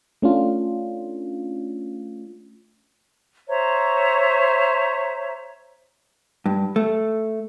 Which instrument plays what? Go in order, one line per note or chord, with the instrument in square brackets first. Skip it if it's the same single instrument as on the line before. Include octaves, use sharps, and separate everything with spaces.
[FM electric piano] A3 C#4 D4 F4
[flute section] C5 C#5 E5 A#5
[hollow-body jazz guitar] G2
A3